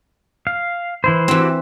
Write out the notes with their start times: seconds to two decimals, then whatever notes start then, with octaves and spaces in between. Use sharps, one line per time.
0.47 F5
1.04 E3 E4 C5
1.28 E3 C4 E4 F#4 G4